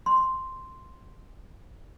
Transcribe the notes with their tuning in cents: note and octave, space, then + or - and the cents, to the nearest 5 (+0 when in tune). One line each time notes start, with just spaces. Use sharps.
C6 +0